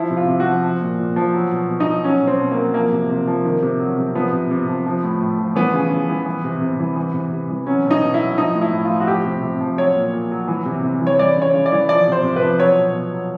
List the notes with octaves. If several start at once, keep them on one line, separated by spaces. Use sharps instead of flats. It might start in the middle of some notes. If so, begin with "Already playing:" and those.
Already playing: F3 E4
C3
F4
C3
F#4
F3
F3
A#2
A#2
F3
F#3
B2
B2
D#4
F#3
F#3 C#4
B2
C4
B2
A#3
F#3
F3 A#3
C3
C3
F3
D#3
C3
F#3
C3
F3 B3
C3
C3
F3
F3
A2
A2
F3
E3 B3
C#3
C#3
E3
E3
C3
C3
E3
E3
C3
C3
E3
F#3 C#4
B2
D#4
B2
E4
F#3
F3 D#4
A2
E4
A2
F4
F3
F#4
F3 G4
C3
C3
F3
F#3 C#5
A#2
A#2
F#3
E3
C3
C3
E3
C#5
E3 D5
C#3
C#5
C#3
D5
E3
F3 D5
C3 C5
C3
B4
F3
F#3 C#5
B2
B2
F#3